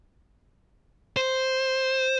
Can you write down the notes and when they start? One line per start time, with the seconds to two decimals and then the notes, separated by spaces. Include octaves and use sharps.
1.17 C5